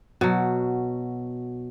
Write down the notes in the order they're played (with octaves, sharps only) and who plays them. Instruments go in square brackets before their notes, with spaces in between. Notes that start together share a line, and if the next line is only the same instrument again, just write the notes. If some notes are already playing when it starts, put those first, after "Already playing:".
[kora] B2 F#3